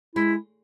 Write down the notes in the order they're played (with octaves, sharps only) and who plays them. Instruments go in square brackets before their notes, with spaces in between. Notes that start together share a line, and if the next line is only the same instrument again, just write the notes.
[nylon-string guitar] G#3 [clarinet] E4